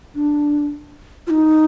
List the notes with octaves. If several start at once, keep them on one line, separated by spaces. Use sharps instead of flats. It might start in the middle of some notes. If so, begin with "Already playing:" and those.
D4
F4
D#4